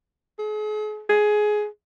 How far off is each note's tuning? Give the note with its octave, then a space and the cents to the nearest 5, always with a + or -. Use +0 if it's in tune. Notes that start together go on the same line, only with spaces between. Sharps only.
G#4 +40
G#4 +15